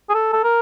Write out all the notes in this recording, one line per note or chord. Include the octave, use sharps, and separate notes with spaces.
G#4
A4
A4
A#4